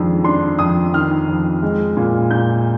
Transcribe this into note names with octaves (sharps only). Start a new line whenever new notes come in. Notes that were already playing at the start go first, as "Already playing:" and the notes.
Already playing: F2 D#3 G#3 D4
D4 C6
F2 D#6
D#3 F6
F2
G#3
A#2
A#2 G6